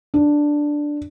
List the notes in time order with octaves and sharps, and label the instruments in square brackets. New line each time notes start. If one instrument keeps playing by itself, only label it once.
[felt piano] D4